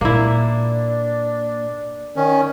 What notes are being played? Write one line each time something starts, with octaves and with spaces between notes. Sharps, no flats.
A#2 A#3 D4 E4
D#3 C#4